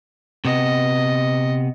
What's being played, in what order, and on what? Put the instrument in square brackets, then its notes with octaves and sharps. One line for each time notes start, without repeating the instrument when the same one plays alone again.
[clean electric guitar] C3 B3 [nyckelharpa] D#5